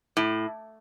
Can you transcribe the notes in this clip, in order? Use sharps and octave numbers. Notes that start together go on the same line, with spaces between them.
A2